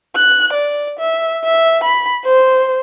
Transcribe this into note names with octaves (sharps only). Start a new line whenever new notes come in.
F#6
D5
E5
E5
B5
C5